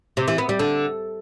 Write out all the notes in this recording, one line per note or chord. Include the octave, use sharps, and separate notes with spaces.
C3
E3
B3
G3
D3